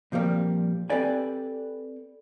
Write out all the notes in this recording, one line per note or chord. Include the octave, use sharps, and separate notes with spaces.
A#2 F3 G3 A#3 C4
C4 G4 A4 B4 D5 G#5